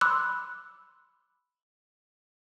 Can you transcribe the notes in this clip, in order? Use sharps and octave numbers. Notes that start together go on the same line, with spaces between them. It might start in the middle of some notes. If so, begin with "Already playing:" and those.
B5 C6 D6 E6 F#6